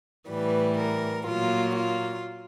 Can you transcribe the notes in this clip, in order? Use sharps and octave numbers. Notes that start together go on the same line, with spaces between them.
A2 E3 G3 B4
A#4
A#2 F#3 A#3 F4
F4